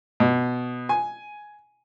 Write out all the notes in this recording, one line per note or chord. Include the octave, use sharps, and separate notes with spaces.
B2
G#5